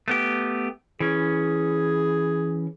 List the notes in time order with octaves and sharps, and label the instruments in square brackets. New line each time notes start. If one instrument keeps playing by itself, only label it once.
[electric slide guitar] A3 B3 G4
[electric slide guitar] E3 C#4 [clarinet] G#4